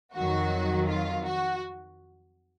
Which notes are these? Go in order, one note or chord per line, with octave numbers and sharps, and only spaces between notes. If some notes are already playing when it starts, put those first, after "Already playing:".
F2 D#3 F#3 F#4
F4
F#4